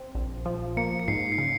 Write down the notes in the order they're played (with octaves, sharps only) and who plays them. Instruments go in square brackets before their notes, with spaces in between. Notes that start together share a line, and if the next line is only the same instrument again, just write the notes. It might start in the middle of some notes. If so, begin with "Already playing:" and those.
Already playing: [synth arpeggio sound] C4
A#1
F3
[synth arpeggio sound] A#3 [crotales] C#7
[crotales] C#7
[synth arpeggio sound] G#2 [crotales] C7
[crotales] C7
[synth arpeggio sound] C#3 [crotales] C#7